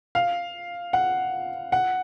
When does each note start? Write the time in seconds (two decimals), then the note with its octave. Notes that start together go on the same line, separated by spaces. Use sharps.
0.15 F5
0.93 F#5
1.72 F#5